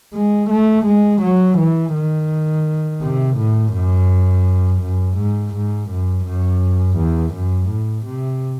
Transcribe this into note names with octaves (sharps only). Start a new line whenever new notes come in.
G#3
A3
G#3
F#3
E3
D#3
C3
A2
F#2
F#2
G#2
G#2
F#2
F#2
E2
F#2
A2
C3